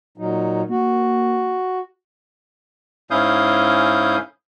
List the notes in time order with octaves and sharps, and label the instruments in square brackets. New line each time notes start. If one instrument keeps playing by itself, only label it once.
[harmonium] A#2 F#3 D#4
[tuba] A#3 [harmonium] F#4
[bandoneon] G#2 C#4 E4 F5 D#6 G6